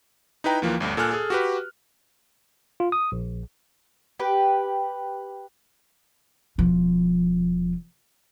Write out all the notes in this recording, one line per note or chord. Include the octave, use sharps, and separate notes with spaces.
D#4 E4 B4 G5 A#5
D#2 E3 F3 A#3
G1 D2 G2
A#2 A4 G#5 F6 F#6
G#4 A4
F#4 G4 B4
F4
D#6
A#1
G4 B4
E1 F3